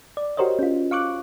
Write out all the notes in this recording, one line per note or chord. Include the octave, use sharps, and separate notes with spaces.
D5
F#4 G4 A#4 C5 C#5 D#5
C#4 F4
F5 C#6 D6 F#6